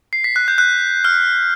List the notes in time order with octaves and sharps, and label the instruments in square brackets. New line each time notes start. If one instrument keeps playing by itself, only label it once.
[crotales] C7
B6
F#6
G6
F#6
F6